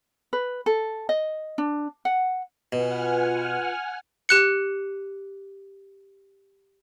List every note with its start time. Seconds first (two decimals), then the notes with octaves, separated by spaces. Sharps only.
0.33 B4
0.66 A4
1.09 D#5
1.58 D4
2.05 F#5
2.73 B2 F4 B4 F#5 G#5 F6
4.29 G4 F#6 C#7